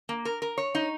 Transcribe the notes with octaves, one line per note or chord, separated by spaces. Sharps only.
A#3
A#4
A#4
C#5
D#4